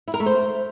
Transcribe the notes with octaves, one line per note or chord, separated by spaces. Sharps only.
E4
A#4
A3
C5